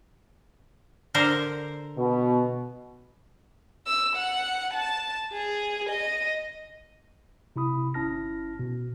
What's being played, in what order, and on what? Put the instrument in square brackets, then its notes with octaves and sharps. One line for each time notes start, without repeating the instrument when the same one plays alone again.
[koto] D3 A#4 C5
[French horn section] B2
[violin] E6
F#5
A5
G#4
D#5
[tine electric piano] C3 E4 B5 D#6
G1 C#4 E4 A5 F6 A#6
B2